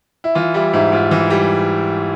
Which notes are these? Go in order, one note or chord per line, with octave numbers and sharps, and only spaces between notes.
E4
E3 F4
G3 E4
G#2 E4
G#2 F4
E3
G3